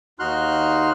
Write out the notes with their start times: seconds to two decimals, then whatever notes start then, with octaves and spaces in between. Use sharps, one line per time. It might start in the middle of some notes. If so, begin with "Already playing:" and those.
0.19 D#2 D#4 F#4 C6 F6 F#6